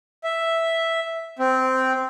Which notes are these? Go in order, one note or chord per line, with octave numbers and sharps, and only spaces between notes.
E5
C4